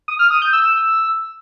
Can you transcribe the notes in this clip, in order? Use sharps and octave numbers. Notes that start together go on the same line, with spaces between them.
D#6
F6
D#6
G6
E6